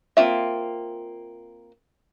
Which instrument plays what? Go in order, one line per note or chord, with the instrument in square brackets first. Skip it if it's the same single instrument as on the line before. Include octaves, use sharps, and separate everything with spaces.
[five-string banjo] A#3 C4 F4 E5